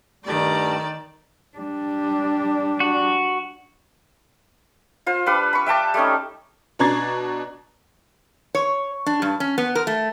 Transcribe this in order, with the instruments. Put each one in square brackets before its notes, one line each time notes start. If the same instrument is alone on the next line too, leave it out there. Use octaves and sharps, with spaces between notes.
[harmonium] G2 G3 A3 [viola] D#3 D5
[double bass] G3 D4
[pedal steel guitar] F#4
[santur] F4 C5
G3 D4 B4 F5
B5 C#6
E5 G5 A5 D6
G3 A3 C#4 D#4
[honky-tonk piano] B2 D4 A#5 G#6 A6 C7
[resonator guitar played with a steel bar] C#5
D4
G2
C#4
B3
A#4
A3